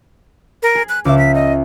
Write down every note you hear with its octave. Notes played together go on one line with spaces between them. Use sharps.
A#4
G#4
F#6
C#2 E5 D6
B6
D#5